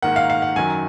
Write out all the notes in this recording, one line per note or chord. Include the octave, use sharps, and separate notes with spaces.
G#2 D#3 A#3 F#5
F5
F5
F#5
F#2 D#3 F#3 G#5